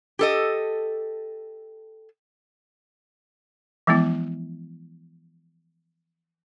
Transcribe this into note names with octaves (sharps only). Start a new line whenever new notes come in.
G4 A4 D#5
E3 F3 G#3 B3 E4